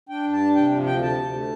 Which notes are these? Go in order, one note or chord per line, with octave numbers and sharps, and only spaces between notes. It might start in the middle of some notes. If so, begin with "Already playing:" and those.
D4 G5
G2
A5
D4
C3 G5
F3
D2 G5
C3 A5
D2
A3